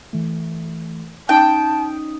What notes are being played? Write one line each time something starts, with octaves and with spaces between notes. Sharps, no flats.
E3 A3
C#4 D#4 G5 A5 D#6